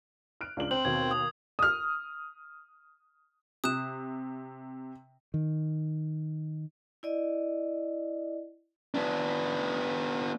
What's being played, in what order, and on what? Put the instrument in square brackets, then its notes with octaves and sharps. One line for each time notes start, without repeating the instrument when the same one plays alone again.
[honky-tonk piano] F6 F#6 D7
C#2 D4 F#7
[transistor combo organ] C4 [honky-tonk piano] C5 [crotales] F#7
[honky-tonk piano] D#2 B2 [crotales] G#6
[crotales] D#6
[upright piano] D#6 F6
[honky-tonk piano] C3 [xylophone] D#6 F#6 E7
[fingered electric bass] D#3
[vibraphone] E4 D5 D#5
[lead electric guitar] B3 D4